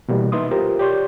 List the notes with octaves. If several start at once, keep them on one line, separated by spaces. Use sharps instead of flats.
B2 E3 G3 A#3
D#4 B4 E5 C6 D#6
F4 G4 A#4 C5
G4 C#5 D5 C6 C#6 G6